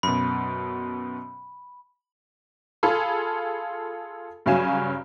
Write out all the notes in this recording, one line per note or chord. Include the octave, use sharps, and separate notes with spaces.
F#2 B2 B5
F4 G#4 A4 F5 B5
G2 C#3 F#3 F5 G#5 E7